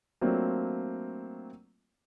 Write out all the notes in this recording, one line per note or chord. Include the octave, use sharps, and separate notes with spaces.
F#3 A3 A#3 C4 D4 F4